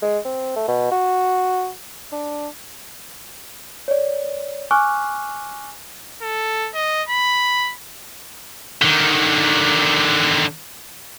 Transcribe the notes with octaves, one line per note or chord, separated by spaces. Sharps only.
G#3
C4
A3
B2
F#4
D4
C#5 D5
G#5 C#6 D6 F6 F#6
A4
D#5
B5
D3 D#3